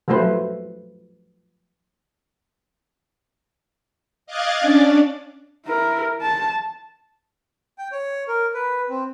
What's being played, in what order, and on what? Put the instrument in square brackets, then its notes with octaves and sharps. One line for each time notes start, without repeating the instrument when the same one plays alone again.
[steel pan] F3 F#3 A3 B4 C5
[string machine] D#5 F5 D6 F#6 G#6 A6
C#4 D4 D5
[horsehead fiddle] E4 A#4
A5
[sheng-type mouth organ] G5
C#5
A#4
B4
C4